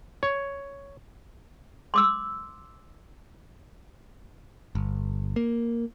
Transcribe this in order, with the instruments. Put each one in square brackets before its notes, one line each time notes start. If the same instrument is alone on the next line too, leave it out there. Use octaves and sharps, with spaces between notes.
[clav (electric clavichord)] C#5
[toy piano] C6 D6 E6
[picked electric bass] G1
A#3